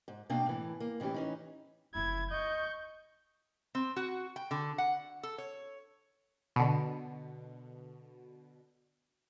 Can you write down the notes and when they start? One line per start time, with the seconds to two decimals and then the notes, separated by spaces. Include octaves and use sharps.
0.08 G#2
0.30 B2 A#3 C4 D4 F5 G5
0.46 A2 E3
0.80 A#3
1.00 A2 E3 C#4 D#4 G4
1.14 E3 C#4 D#4
1.95 F#1 F3 E4 G#6
2.31 D#2 D#5 C#6 G6
3.75 C4
3.96 F#4
4.36 G5
4.51 D3
4.78 F#5
5.23 A4
5.38 C#5
6.56 B2 D3